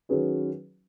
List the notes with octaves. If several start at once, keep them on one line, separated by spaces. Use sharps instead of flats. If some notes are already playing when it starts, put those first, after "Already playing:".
D#3 F#3 C#4 G#4 B4